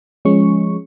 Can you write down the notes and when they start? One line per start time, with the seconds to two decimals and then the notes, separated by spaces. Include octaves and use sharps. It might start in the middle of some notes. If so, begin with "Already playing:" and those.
0.25 F3 G#3 C#4 C#6